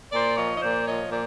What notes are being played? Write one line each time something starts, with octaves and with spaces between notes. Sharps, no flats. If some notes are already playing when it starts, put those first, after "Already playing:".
A#2 C5 D5
F3 C#5 D#5
D#5
A#2 C5 D5
F3 C#5 D#5
A#2 C5 D5